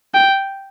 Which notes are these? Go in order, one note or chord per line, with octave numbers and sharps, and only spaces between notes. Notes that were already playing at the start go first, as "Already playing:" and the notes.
G5